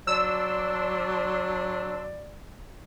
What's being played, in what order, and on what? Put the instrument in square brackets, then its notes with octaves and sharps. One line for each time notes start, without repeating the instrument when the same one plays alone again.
[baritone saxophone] F#3 [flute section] D4 C6 [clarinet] D5 [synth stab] E6